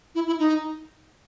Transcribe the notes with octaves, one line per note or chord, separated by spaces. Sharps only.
E4
E4
D#4